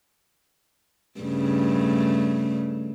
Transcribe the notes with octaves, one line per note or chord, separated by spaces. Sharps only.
G2 C#3 A3